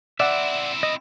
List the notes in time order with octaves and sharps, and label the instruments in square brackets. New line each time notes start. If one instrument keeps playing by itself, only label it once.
[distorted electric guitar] C4 E4 [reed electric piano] D5 F#5 [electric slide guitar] E5
[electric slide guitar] D#5